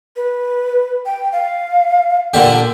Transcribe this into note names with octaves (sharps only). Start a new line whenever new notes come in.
B4
G5
F5
A#2 D3 G4